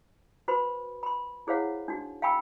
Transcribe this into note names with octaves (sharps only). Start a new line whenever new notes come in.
F#4 B4 C5 B5 C6
B5 C6
E4 G#4 C5 C#5 F5 F#5
D4 D#4 F#4
F5 G5 G#5 B5 C#6 E6